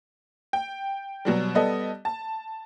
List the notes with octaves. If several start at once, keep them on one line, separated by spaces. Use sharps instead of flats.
G5
B2 F#3 G3
G3 B3 A4 D#5
A5